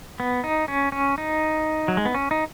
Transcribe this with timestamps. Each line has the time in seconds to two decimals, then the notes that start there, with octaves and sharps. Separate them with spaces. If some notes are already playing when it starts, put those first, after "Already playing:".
0.20 B3
0.44 D#4
0.68 C#4
0.92 C#4
1.18 D#4
1.88 F#3
1.97 G#3
2.05 B3
2.14 C#4
2.31 D#4